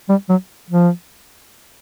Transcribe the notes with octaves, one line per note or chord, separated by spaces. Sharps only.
G3
F#3
F3